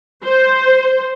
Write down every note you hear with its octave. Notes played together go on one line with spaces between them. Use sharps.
C5